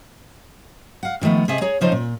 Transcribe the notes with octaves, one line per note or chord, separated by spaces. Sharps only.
F5 F#5
D3 D#3 F3 A3 B3
C3 G#4 D#5 E5
G#4 C#5 A#5
C#3 F3 C#4 D#4 A4 C5
A#2